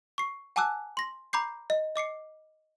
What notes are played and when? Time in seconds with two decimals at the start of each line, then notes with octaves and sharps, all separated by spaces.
0.18 C#6 C7
0.56 F#5 G#5 A5 D6 E6 F#6
0.97 C6 A#6
1.33 A#5 B5 D6 G6 C7
1.70 D#5
1.96 D#5 D6 C7 C#7